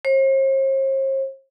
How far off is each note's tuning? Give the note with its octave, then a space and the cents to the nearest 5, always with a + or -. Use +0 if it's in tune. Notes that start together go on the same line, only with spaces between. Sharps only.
C5 +45